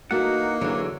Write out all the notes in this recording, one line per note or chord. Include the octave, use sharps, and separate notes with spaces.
E3 A3 A#3 D#4 F#4 F#5
D3 E3 F#3 D4 G#4 C#5